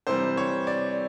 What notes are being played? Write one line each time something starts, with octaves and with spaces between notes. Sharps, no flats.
C3 E3 G3 C5
C#5
D5